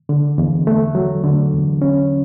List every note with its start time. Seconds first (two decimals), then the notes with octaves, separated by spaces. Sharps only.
0.09 D3
0.38 E2
0.67 A3
0.95 F#3
1.24 D3
1.53 E2
1.82 C#4